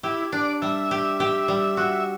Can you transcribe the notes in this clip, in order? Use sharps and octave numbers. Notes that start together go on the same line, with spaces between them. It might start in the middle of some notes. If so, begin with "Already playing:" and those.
E4 G4
D4 D5
G3 E5
G4
G4
G3
F#4